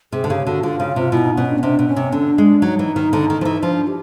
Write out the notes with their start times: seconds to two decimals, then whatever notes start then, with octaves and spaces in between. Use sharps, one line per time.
0.12 C3 G#4
0.24 D3
0.29 C#3 G4
0.46 D3 F#4
0.63 D3 F4
0.80 C#3
0.96 C3
1.12 B2 E4
1.25 D#4
1.37 B2 C#4
1.50 D4
1.58 C#4
1.62 C3 D4
1.79 B2
1.88 C#4
1.96 C3
2.12 D3 D4
2.38 G#3
2.62 F#3 D#4
2.79 E3
2.96 D#3
3.13 D3
3.30 D#3
3.41 F3
3.45 E3
3.62 F3 D4
3.87 G4